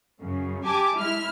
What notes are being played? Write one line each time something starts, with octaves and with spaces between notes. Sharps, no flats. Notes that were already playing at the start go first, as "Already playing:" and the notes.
F#2 C#3
G4 G#5 A5 D6
G#3 E4 F6